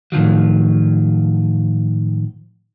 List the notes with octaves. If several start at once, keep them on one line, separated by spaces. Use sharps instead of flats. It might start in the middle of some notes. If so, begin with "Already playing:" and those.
A2 D#3 F3 F#3